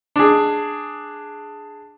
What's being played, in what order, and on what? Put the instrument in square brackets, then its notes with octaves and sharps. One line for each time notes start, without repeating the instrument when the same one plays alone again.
[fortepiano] D4 G#4